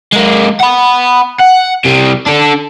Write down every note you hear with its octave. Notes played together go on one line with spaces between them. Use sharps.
G#3 A#3
F#5 B5
F#5
C3 G3
D4 A4